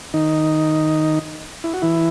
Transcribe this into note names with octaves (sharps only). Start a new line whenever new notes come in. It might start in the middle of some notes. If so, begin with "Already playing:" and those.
D#3 D#4
E4
F#4
E3 E4